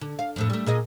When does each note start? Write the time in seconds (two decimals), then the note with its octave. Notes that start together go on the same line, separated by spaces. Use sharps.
0.01 D3
0.19 F5
0.36 F2 A2 A4
0.50 G3 A3
0.66 A#2 G#4 D#5